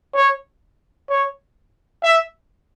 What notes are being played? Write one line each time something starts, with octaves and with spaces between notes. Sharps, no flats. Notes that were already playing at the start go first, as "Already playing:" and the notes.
C#5
C#5
E5